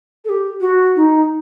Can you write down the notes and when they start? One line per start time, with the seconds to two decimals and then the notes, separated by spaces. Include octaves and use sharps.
0.25 A4
0.29 G4
0.60 F#4
0.96 D#4